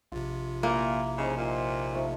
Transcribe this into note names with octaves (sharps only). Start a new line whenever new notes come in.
A#1 C3 F4
A#2 A#3 E4 A4
C#3 D#4 C5
A#2
F3 A3 D#4